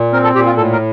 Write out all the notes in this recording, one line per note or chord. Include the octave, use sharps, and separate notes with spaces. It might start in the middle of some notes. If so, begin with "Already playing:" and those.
Already playing: A#2
C4 A#4
A4
A#2 G4
F4
A2 A4
A#4